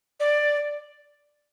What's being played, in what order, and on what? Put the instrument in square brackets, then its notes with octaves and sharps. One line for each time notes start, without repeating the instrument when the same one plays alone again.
[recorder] D5